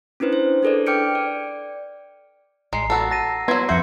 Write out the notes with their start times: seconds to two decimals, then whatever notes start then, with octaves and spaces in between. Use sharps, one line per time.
0.20 C#4 D4 E4 B4 C5
0.33 C5
0.63 D4 G#4 A4 B4 D5
0.86 G5 D6 F6 G6 C#7 D7
1.15 D5
2.73 A1 G#3 A#5 C7
2.90 B3 F#4 A4 E6
3.11 A5 A#6 D#7
3.48 F#3 B3 E4 C6 G#6
3.69 F2 F#4 E5 C6 G6 C#7